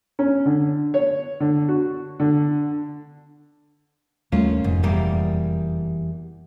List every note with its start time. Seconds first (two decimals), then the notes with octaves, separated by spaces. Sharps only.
0.19 C#4
0.46 D3
0.94 C#5
1.40 D3
1.69 F#4
2.20 D3
4.32 D#2 G3 A3 A#3 C#4 F4
4.64 F1 G#2
4.83 E2 G3 A#3